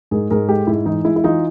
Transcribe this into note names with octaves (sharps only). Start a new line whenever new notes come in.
G#2 G#4 A#4
G#2 G#4 A#4
G#3 G4 A4
G#2 E4
E3 D#4
G#3 E4
E4
E3 D#4 F4